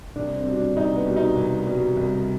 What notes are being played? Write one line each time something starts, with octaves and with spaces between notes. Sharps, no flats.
C2 D4
C4
B2 G3
D4
C2 D#4
B3
B2 G3
D#4
C2
B2 G3
C2